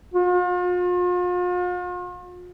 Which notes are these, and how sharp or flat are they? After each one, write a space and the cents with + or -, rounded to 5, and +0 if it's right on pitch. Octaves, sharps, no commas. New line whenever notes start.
F4 +40